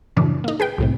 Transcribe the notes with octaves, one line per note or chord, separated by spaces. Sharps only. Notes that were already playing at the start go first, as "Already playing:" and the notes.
F#2 A2 C#3 E3 D4
A#3 D#4
G#4 B4 G5
B1 A2 C3